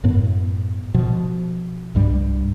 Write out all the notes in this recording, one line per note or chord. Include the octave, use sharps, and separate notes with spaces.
F#2 A2 B3
B2 F3
C2 G2 G3